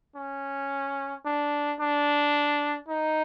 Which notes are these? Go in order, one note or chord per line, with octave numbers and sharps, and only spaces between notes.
C#4
D4
D4
D#4